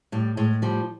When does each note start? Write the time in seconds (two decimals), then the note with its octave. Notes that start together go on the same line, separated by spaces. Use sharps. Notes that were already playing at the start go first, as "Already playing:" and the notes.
0.12 A2 G3
0.37 A2 G#3
0.62 F3 G3